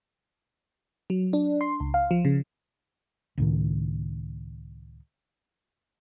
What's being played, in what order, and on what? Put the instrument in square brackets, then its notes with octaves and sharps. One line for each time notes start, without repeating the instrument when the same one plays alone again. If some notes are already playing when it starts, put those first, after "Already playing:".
[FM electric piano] F#3
D4
C6
C#2
F5
F3
C#3
[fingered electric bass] C#2 A2 D#3